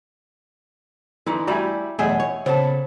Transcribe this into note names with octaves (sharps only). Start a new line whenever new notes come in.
D3 E3 D#4
G3 A3 E4 F#4 D5 G#5 A#5
B1 E2 A3 G#4 D#5 E5 F#5 G#5
C#5
A#2 C#3 B3 A4 C5